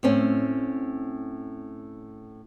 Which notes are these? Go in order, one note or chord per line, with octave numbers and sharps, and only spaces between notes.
A2 C4 C#4